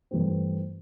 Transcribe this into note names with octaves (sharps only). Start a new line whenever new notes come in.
G2 E3 A3 C4